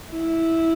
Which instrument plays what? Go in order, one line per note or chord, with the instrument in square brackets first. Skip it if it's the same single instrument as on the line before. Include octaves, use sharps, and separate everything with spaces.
[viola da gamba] E4